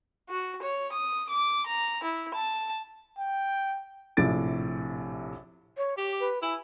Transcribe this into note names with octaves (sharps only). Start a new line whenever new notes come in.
F#4
C#5
D#6
D6
A#5
E4
A5
G5
A#1 A2 C3 A6 D7
C#5
G4 D6
B4
E4 G#5